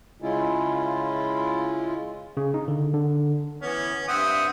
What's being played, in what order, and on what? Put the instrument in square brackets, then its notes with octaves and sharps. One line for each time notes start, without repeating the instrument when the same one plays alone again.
[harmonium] C#3 G#3 C#4 E4 F4
[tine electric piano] C#3
D#4
D3
D3
[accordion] E3 B3 [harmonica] C#4
[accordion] G2 E5 F#5 [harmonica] C4 D#6